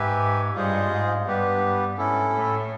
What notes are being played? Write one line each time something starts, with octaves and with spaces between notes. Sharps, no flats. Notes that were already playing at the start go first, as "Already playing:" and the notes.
Already playing: G#2 G4 B4 E5 G#5
G2 F4 G#4 C5 D#5
G#2
G2 B3 D4 G4 B4
G#2 C#4 E4 A4
A2